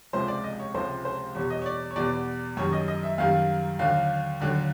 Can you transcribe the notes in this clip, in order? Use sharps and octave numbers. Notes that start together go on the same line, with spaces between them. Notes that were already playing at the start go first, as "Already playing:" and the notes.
C#2 C3 F3 G#3 C5
D5
D#5
C#5
C#2 C3 F3 G#3 C5
C5
E2 B2 G3 C#5
D#5
C#5
D5
C#5
E2 B2 G3 D5
F#2 D#3 G3 C#5
D#5
D#5
E5
F#2 D#3 G3 F5
D#2 D3 F#3 F5
D#2 D3 F#3